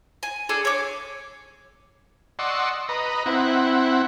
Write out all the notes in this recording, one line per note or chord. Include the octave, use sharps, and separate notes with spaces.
G#5
D4 G#4 A4
C#5 D6
D5 D#5 F#5 C6 C#6 E6
B4 D#5 A#5
C4 E4 F#5